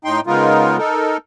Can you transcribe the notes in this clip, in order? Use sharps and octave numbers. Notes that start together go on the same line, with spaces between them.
A2 D#4 G5 C6
C#3 G#3 B3 D#4 F4 A#4
D#4 A4 A#4